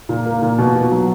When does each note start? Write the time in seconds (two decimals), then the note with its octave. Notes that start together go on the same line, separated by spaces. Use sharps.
0.09 A#2
0.25 A#3
0.42 A#2
0.58 B2
0.75 B2
0.91 F#3